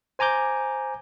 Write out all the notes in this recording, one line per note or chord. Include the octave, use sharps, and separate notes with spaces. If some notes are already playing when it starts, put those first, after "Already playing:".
C5 G#5 A#5 D6 G6